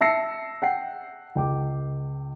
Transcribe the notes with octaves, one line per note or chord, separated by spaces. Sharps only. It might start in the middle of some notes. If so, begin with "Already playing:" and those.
E5 A5 E6 A#6 C7 C#7
F#5 G5 C7
C#2 G5 D6